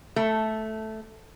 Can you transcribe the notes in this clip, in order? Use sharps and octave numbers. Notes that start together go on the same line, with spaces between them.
A3